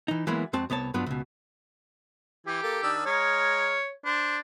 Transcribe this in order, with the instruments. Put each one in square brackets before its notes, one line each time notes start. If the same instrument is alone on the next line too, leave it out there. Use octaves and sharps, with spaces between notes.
[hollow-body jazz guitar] E3 D#4
E3 F#3 G#3 A#3 B3 E4
F2 G#3 C4 F#4 A5
C2 B3 C#5 A5
G2 F#3 B3 D4 F4
C#2 B2
[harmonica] E3 [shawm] G4
[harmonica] A#3 A4
D#3 D4 E6
[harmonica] G#3 A#5 F6 [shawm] C#5
[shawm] D4 [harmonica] C5